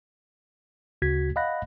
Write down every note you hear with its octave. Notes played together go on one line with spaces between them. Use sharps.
D2 C#3 F#4 G#6 B6
D#5 F5 F#5 B5 F#6 A#6